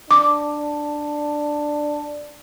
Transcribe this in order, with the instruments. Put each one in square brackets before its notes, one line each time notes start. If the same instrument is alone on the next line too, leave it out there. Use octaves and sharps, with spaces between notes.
[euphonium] D4 [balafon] D6